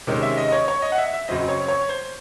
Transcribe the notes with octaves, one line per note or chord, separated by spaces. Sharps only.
C3 D#3 G#3 C#4
E5
D#5
D#5
C#5
C#5
D#5
F#5
E5
E5
F#2 C#3 F#3 C4 D#5
C#5
C#5
C5